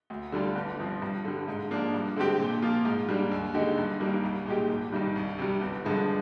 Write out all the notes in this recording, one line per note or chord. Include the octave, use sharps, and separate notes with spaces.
D2
D3 G3 D4 F4
G1
G2 F3 C4
G2
D3 G3
G#2
F3 A#3 D4
G2
D3 G#3 C4 G4
A#2
F3 A#3 F4
G#2
G3 A#3 D4
D#2
D3 G#3 D#4 G4
G2
D#3 G3 A#3
C2
A#2 G#3 D#4 G4
G#1
G2 D#3 G3
C2
C3 G3
G1
G2 D3 F3 G#3